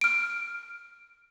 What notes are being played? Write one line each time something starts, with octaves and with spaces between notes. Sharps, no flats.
F6 D7